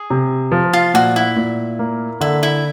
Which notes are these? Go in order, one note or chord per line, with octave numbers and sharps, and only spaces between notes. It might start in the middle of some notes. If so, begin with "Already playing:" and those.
Already playing: G#4
C3
F3
F4
A#2 F#4
E4
A#2
A#3
D3 E4
E4